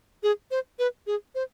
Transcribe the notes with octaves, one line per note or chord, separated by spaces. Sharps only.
G#4
C5
B4
G#4
C5